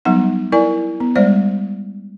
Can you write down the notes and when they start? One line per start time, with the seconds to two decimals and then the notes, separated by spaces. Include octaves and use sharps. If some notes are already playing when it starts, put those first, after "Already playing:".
0.05 F#3 G3 B3 D#4 F#5
0.52 E4 A#4 D5 G#5
1.00 B3
1.15 G3 G#3 C5 D5